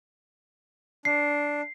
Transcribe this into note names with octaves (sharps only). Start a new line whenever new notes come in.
D4 C7